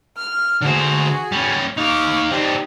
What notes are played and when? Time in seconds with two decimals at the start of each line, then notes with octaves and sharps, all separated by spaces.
0.17 F6
0.62 D3 F#4 G#4 C5
1.32 G3 C#4
1.77 D#4 F5 C#6 D6
2.31 C4 D4 D#4 G4